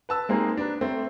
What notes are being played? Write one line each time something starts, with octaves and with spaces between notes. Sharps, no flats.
B4 A5 E6
G#3 A#3 C4 D#4 G#4
D4 B4 A#5
A3 C4